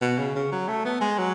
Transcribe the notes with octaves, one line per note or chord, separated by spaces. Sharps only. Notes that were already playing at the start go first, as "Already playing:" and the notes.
B2
C#3
C#3
F#3
A3
B3
G#3
F#3